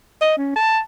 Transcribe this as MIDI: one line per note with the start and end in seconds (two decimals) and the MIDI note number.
0.21 0.36 75
0.38 0.52 61
0.56 0.80 81